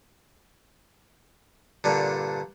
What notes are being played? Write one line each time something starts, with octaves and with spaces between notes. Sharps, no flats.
G2 A#2 D3